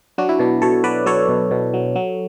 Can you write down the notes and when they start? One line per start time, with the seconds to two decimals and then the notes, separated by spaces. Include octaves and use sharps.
0.18 F#3 D4 F#4
0.29 E4
0.39 B2 D4
0.62 B2 A4 C#5
0.84 F#3 B4 D5
1.06 F#3 A4 C#5
1.29 B2
1.51 B2
1.74 F#3
1.96 F#3